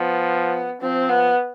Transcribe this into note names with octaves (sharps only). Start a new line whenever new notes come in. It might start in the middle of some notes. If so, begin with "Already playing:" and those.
Already playing: F3 B3
F3 C4
B3